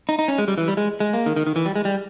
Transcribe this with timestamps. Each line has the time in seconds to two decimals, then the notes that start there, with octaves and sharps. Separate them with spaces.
0.09 D#4
0.19 D#4
0.28 C#4
0.38 G#3
0.48 G3
0.58 E3
0.68 G3
0.77 G#3
1.00 G#3
1.13 A#3
1.26 D#3
1.36 D#3
1.47 D#3
1.56 E3
1.66 G3
1.76 G#3
1.85 G3